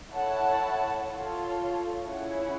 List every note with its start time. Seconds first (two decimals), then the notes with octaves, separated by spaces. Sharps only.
0.10 E4 A4 C#5 F#5 A5
1.08 F4 A4 C#5
2.05 C#4 E4 G#4 C#5 F#5